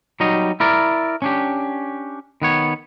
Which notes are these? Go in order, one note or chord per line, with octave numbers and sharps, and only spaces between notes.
F#3 G3 D#4 C#5 D#5
E4 A#4 D5
C#4 D4 G4
D#3 B3 C#5